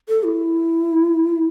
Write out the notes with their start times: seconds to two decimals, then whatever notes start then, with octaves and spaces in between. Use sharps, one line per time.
0.09 A4
0.24 E4